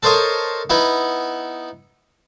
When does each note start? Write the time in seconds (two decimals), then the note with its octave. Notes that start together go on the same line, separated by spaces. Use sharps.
0.03 A4 A#4 C5 C#5 D#5
0.70 B3 D#4 E4